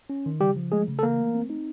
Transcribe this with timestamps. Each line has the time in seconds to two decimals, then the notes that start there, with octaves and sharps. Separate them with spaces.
0.10 C#4
0.26 D#3
0.41 C#3 G3 G4
0.57 F3
0.72 G#3 A3 G#4
0.88 C#3
0.99 A4
1.03 E3 A#3 A#4
1.18 A3
1.34 C4
1.50 D#4